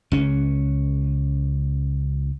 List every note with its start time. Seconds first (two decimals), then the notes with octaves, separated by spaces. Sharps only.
0.12 C#2 C#4